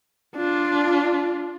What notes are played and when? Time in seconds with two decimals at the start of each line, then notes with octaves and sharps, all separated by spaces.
0.36 D4 F4